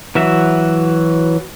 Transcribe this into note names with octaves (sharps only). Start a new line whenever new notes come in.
E3 F#3 F#4 E5